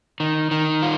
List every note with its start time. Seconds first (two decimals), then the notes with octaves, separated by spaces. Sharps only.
0.20 D#3
0.51 D#3
0.82 F4